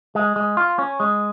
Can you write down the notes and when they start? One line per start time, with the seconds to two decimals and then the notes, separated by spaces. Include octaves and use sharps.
0.15 G#3
0.36 G#3
0.57 F4
0.79 C#4
1.00 G#3